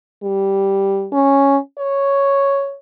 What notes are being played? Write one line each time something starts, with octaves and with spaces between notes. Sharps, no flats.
G3
C#4
C#5